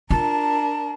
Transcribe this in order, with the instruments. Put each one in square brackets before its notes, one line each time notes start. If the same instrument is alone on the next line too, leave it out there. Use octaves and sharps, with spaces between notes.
[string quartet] D4 A#4 [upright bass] F4 [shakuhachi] A5